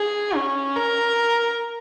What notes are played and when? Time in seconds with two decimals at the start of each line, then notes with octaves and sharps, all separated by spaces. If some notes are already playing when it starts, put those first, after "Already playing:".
Already playing: G#4
0.35 C#4
0.76 A#4